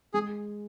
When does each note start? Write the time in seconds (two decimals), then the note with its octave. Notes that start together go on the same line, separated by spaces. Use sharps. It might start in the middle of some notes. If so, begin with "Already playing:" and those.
0.14 G#3 G#4